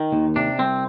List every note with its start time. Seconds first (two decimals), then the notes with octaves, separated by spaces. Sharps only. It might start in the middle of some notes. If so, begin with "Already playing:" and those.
Already playing: D#3 D#4
0.12 D#2
0.36 C3 D4
0.59 C2 C4